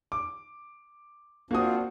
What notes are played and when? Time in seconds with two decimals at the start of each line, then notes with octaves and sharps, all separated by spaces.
0.12 D6
1.51 A#3 C4 D4 F4 F#4 D#6